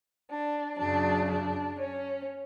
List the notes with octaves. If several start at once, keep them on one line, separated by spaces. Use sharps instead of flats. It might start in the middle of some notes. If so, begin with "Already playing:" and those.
D4
F#2 C#3 F#3 D4
D4
C#4